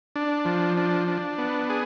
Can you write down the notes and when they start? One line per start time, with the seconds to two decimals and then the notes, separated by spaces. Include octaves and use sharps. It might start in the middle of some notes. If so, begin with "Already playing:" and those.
0.16 D4
0.45 F3
0.77 D4
1.08 D4
1.38 B3
1.70 G#4